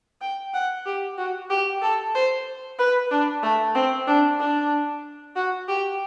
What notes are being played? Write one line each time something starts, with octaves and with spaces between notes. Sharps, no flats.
G5
F#5
G4
F#4
G4
A4
C5
B4
D4
A3
C4
D4
D4
F#4
G4